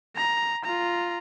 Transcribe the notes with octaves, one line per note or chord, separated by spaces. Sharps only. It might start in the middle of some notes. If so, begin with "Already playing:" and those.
A#5
F4 A#5